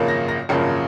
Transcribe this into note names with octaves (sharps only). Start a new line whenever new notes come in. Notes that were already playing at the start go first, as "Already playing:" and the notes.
Already playing: G#1 F#2 C#3 F3 A#3
A#6
A#6
G#1 F#2 C#3 F3 A#3